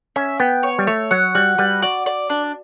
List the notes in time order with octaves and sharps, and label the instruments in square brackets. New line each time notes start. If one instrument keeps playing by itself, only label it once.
[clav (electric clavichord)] C#4 [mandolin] E5
[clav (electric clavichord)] B3 [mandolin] G5
[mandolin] C#5
[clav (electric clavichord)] G3
[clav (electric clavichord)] A3 [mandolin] C#5
[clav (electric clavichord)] F#3 [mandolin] F#5
[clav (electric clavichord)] G3 [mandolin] F#4
[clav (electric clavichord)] G3 [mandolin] B4
[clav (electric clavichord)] F#4 [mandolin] D5
[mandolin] D5
D4